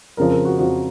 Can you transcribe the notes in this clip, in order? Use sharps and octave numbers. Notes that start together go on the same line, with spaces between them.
F2 C#3 F3 A#4
A#4
F#4
F2 C#3 F3 F#4